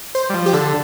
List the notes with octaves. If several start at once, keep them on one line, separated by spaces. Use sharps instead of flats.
C5
G3
F3
G4
D3 A4